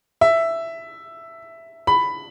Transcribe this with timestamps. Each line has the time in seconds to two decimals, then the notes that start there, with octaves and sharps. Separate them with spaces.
0.21 E5
1.87 B5